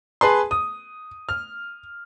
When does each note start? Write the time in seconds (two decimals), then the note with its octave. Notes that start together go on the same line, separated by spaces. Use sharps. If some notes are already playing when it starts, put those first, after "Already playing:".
0.21 G#4 B4 A5 C6
0.51 D#6
1.29 F6